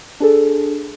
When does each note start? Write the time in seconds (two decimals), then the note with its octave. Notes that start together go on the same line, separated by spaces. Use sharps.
0.20 D4 G#4 A4